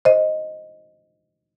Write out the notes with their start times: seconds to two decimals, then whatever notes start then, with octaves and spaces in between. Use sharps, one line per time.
0.05 C5 D#5